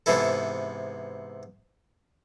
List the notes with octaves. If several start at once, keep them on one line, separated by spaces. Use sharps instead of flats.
G#2 C3 E3 B3 E4 A4